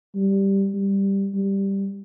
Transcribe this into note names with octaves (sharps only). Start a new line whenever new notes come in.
G3
G3
G3